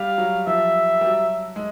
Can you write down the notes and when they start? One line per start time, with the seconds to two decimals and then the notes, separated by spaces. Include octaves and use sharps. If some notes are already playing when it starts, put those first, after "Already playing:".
Already playing: G3 F5
0.18 F#3
0.47 F3 E5
1.01 G3
1.06 F#3
1.56 G#3